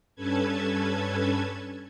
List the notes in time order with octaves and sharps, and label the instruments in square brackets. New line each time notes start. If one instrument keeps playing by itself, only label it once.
[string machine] G2 C#4 A4 B4 A5 G#6